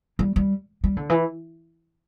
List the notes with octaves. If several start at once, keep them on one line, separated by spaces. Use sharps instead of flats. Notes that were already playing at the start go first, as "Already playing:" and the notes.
G3
G3
G3
D3
E3